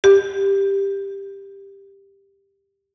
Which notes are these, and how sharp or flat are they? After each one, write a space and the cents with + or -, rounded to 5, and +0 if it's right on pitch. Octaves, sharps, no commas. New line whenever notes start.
G4 +10